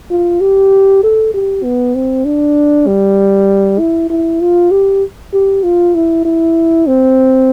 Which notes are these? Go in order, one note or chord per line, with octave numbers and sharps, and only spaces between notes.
F4
G4
A4
G4
B3
C4
D4
G3
E4
E4
F4
G4
G4
F4
E4
E4
C4